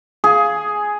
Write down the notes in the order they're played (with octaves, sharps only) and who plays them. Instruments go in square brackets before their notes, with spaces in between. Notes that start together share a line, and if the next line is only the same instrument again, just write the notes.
[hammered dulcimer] G#4